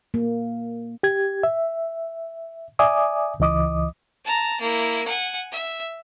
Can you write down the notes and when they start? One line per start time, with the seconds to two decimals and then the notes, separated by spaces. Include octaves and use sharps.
0.14 A#3
1.03 G4 G#6
1.43 E5
2.79 D5 E5 G#5 D6 D#6
3.40 C#2 E3 D#5 D6 D#6
4.25 A5 A#5
4.61 A#3 E4
5.07 F#5 G#5
5.52 E5